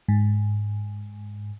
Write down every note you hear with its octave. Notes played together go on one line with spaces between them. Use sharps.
G#2